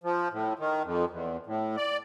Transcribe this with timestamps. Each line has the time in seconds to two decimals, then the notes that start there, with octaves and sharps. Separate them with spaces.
0.04 F3
0.32 A2
0.59 D#3
0.84 F2
1.10 E2
1.46 A2
1.77 D5